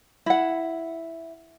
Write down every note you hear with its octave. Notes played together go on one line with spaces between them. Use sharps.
E4 F#5